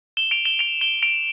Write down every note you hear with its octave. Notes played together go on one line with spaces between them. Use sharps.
E7 G7
D7 F7
E7 G7
D7 F7
E7 G7
D7 F7